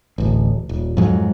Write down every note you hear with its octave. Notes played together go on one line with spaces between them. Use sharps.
D1 A1
D#1
F2 G#2 E3 F#3